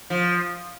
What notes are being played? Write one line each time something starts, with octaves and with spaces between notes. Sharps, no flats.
F3